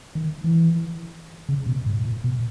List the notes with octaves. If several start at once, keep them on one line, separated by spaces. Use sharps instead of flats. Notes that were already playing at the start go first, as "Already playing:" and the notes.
D#3
E3
C#3
B2
G#2
A#2
B2